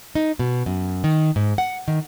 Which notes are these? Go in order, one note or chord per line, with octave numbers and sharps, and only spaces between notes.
D#4
B2
F#2
D#3
G#2
F#5
D#3